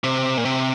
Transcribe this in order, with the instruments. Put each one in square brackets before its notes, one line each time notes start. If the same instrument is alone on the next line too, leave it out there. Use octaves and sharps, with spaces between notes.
[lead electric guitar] C3
A#2
C3